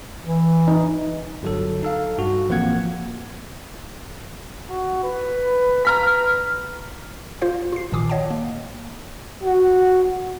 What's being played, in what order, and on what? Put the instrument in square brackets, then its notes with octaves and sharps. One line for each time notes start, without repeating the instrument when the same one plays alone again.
[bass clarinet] E3
[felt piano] D#4
[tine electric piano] G1 F#3 A4
D#4 A4 F5
G2 F#4
A1 F3 A#3 C4 F#5 G#6
[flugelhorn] F#4
B4
[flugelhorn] B4 [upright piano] A#5 F6 B6
[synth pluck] F4 C5 F5
F4 C7
A#1 A#2 D#3 G#5 D6 D#6
C#5 D#5 F#5 G5 A5
A#3
[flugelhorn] F#4